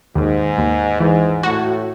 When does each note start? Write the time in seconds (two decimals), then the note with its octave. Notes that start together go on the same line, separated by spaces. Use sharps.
0.15 D#2 G#2
0.58 D#2
1.00 G#2 E3
1.43 A2 F#4